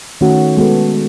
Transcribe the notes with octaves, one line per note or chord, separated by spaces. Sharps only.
D#3 A3 C#4 F#4
G#3 B3 F#4 A4